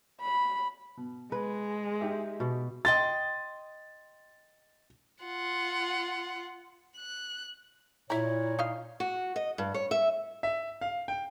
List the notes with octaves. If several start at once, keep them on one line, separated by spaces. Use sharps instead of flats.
B5
B2
G#3 B4
D#4 G4 E5
B2
D#5 G5 C6 A6
F4 F#5
F#6
A#2 E4 C#5 E5 A#5
D#4 F4 F5
F#4
D#5
G2
C#5
E5
E5
F5
G5